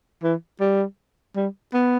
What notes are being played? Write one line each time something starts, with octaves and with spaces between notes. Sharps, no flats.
E3
G3
G3
B3